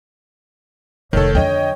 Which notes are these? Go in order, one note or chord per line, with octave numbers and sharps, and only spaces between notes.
F1 D#3 A3 A4 C#5
F2 D3 C#5 D#5 G5